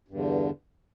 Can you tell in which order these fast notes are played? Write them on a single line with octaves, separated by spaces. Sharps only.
G2 E2 D3